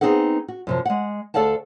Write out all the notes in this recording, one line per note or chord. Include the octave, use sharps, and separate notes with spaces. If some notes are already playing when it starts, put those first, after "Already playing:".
B3 C4 D#4 G#4 A4 F#5
F#4
F#2 C3 F3
G#3 F#5
D2 A4 D5 F5 F#5 A5